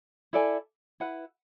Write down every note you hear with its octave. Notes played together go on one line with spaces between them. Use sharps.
E4 A4 D5 G#5
E4 B4 F#5